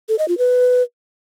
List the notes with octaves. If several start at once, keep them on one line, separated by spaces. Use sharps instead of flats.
A4
D#5
F4
B4